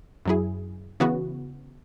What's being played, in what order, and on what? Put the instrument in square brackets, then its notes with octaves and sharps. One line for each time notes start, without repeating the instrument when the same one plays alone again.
[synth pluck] F#2 F#3 E4 G#4
C#3 E3 B3 F#4